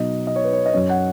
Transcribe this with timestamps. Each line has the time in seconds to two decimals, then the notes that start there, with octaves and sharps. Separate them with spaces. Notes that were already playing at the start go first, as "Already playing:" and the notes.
Already playing: B2 F#3 D#4 D#5
0.27 D#5
0.36 C#5
0.44 B4
0.53 C#5
0.66 D#5
0.73 F#2 F#3 C#4 C#5
0.89 F#5